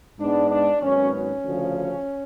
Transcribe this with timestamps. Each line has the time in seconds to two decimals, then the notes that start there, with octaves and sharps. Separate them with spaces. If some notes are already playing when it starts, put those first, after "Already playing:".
0.19 G#2 G#3 B3 D4
0.51 D4
0.82 G#1 G#2 F#3 B3 C#4
1.12 C#4
1.44 D2 C#3 F3